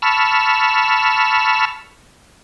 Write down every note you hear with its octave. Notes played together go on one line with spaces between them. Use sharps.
A5 B5 C#6 E6 F6